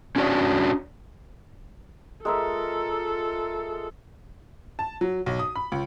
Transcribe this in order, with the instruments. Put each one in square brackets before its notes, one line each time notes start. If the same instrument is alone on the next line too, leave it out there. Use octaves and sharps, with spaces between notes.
[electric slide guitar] C#4 D4 F#4 G4 C#5 D5
[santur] G#3 A#4 E5 [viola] F4 A4
[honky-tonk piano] A5
F#3
B1
D#6
B5
C#2